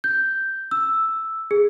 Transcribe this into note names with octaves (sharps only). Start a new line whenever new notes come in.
G6
E6
G#4